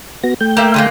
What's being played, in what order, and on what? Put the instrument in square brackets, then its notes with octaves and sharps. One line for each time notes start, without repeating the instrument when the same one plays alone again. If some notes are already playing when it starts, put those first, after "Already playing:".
[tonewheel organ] B3 F#4 A#6
A3 G5 G6
[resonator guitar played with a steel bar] A#3 E5
D3 G#3 A#3